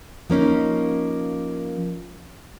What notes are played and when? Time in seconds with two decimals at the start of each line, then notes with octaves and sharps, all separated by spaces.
0.30 F3 A#3 C#4 D#4